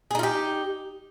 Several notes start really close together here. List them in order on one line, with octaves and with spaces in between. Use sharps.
G#4 D#4 F4 G4